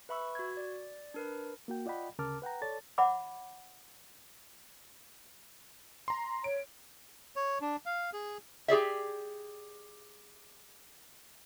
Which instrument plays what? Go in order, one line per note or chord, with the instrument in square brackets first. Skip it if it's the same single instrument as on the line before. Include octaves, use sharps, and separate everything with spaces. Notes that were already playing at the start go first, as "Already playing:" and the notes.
[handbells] B4 E5 B5 C#6 E6
F#4 G#6
D5
D4 A#4 B4
[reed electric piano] A#3 F#4 G5
F4 D5 D#5 F#5 G5 B5
D2 C#3 A#4 A5 D6 F6
B4 F#5 G5 A#5
A4 C#5 D5 A5 A6
[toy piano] C#5 E5 F#5 B5 D6
[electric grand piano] A#5 C6
[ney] C#5 [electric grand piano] D7
[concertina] C#5
D4
F5
G#4
[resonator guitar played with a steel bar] G4 G#4 D5 E5